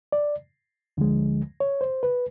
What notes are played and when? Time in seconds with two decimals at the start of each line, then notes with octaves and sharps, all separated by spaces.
0.12 D5
0.97 D2 D3 F3 G#3
1.60 C#5
1.81 C5
2.03 B4